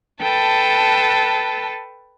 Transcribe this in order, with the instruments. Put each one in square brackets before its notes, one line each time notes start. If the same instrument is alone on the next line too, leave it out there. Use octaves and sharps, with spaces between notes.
[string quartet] A4 B4 G5 A5